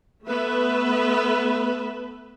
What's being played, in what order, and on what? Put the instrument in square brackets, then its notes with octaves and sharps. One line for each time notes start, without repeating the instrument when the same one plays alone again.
[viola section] A3 B3 B4 E5